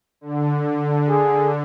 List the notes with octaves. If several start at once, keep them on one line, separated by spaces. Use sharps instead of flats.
D3
G#4